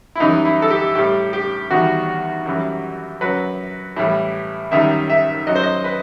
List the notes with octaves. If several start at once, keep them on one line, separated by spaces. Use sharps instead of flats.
E4
F#2 E3 G3 D#4
E4
A4
G4
A2 G3 G4
G4
E2 D#3 G3 F#4
F#2 E3 G3
F#2 F#3 B4
A2 E3 G3
F#2 D#3 G3 E5
E5
F#2 F#3 D#5
C5
D#5
B4